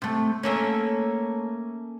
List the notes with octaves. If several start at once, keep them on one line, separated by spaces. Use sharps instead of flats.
C3 A3
A3 A#3 C#4